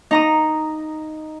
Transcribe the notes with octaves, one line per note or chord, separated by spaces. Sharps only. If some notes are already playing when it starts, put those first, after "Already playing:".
D#4 A#5 D#6